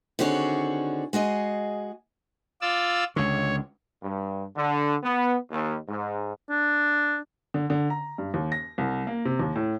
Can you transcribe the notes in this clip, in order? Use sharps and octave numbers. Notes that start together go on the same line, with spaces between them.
D3 D#3 C4 F#4 G#4 C#5
G#3 F#4 G#4 D#5
F4 D5 E6
C#2 D3 C#5
G2
D3
B3
D#2
G#2
D4
D3
D3
A#5
G2
D#2
A#6
C2
A#3
C3
D#2
A2